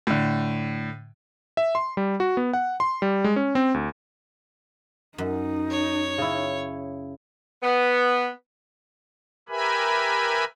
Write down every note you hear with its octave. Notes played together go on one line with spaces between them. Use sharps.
A2 D3
E5
C6
G3
F#4
B3
F#5
C6
G3
G#3
C#4
C4
D2
F#2 D#4
C#5
C#3 E4
B3
G4 A#4 B4 E5 G#5 B5